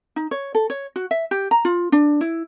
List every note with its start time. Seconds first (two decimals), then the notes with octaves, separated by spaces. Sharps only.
0.16 D#4
0.31 C#5
0.55 A4
0.70 C#5
0.96 F#4
1.11 E5
1.31 G4
1.51 A#5
1.65 F4
1.92 D4
2.21 E4